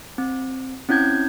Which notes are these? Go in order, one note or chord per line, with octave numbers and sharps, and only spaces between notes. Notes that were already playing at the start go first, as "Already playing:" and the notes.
C4
C4 C#4 E4 G6 G#6